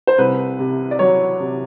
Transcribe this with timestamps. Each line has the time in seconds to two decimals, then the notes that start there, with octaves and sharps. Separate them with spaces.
0.07 C5
0.18 C2 B4
0.59 C3
0.91 D5
0.99 F#3 C#5
1.40 C3